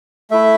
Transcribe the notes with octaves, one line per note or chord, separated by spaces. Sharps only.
A3 E4 E5